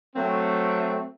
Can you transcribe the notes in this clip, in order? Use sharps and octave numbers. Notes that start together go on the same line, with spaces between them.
F#3 A3 C4